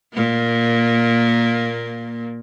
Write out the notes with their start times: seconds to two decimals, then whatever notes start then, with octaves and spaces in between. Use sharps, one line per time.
0.14 A#2 A#3